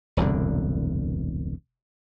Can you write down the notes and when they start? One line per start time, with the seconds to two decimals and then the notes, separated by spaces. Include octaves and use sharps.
0.17 E1 C2 F#2 D3